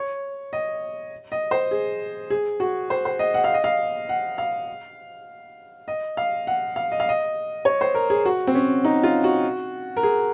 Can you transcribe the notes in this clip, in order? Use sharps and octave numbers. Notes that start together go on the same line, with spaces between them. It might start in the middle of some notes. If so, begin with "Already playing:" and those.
Already playing: C#5
D#5
D#5
C5
G#4
G#4
F#4
C5
C5
D#5
F#5
F5
D#5
F5
F#5
F5
D#5
F5
F#5
F5
D#5
F5
D#5
C#5
C5
A#4
G#4
F#4
C4
C#4
D#4
F4
F#4
A#4
G#4